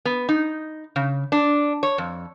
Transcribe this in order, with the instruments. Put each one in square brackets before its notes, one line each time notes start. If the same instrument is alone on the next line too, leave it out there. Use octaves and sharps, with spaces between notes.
[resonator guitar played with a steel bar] B3
D#4
C#3
D4
C#5
F2